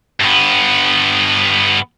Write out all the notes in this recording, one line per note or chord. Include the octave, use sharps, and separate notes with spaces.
G2 B3